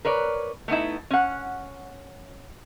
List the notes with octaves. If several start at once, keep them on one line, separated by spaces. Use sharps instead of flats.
A#4 B4 C#5 D5
A3 B3 D#4 E4
C#4 F#5